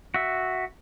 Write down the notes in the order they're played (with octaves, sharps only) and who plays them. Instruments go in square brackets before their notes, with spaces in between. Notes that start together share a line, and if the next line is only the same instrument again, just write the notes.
[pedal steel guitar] F#4 E5